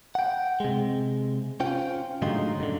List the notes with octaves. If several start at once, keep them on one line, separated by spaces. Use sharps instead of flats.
F#5 G5
C3 G#3
C#4 F4 C5 G5
A2 D3 F#3 G#3 D#4 F4
F#2 D3